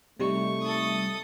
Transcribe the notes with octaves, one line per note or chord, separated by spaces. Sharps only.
C3 G3 A3 D#4 C#6
A4 D#6